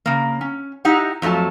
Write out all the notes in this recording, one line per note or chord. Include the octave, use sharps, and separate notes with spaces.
C#3 A#3
C#4
D#4 E4 G4 F#5
F2 F#3 A3 F4 A5